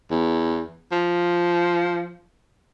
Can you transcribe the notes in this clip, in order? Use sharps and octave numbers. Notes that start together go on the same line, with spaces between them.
E2
F3